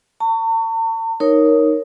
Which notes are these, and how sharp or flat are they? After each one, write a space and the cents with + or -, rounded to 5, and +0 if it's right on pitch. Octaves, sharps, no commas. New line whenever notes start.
A5 +45 C#6 +15
D#4 +0 A#4 +0 C#5 +0